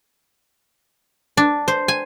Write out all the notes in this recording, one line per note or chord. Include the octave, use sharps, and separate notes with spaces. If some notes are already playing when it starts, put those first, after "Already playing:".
D4
C5
G#5